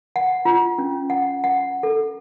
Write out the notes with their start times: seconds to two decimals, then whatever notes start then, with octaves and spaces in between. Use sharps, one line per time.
0.16 F#5
0.45 F4
0.78 C#4
1.10 F#5
1.44 F#5
1.83 A4